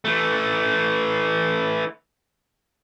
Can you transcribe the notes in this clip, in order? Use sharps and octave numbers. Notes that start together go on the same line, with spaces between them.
E3 A3